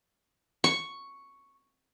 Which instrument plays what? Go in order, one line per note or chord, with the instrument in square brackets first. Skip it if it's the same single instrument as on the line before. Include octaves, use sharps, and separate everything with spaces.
[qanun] C#6